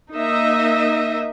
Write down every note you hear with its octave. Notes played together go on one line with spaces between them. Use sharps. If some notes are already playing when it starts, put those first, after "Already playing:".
A#3 D#4 D#5 E5